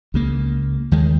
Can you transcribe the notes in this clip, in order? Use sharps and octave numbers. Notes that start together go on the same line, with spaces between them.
C#2 C#3 A#3
D#2 D#3 G#3